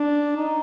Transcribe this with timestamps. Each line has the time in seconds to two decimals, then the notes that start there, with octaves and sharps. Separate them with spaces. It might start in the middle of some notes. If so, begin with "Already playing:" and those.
Already playing: D4
0.37 D#4